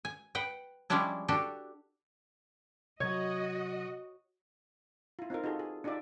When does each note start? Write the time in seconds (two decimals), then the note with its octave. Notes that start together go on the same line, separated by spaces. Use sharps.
0.05 G#5
0.35 B4 F#5 G5
0.90 F3 G3 G#3 C#4 D4 E4
1.28 D4 F#4 G4 A4
3.00 C3 F#3 F#4 C#5 D#5 G#6
5.19 E4 F4
5.30 C4 D#4 F4 A#4
5.44 D#4 F4 F#4 G#4 A4
5.59 G#4
5.84 D4 D#4 F4 G4 D5 E5